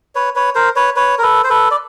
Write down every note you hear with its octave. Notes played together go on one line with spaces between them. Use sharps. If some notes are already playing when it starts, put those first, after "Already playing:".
B4 C#5
B4 C#5
A#4 C5
B4 C#5
B4 C#5
A#4
A4 B4
C5
A4 B4
D5